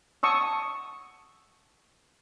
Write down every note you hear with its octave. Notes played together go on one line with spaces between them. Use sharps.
A5 C#6 D#6 E6